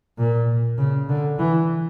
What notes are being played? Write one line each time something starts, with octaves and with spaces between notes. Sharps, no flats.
A#2
C#3
D3
E3